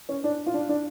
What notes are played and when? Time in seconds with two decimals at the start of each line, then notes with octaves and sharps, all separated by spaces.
0.09 C#4
0.24 D4
0.46 F4
0.54 D4
0.69 D4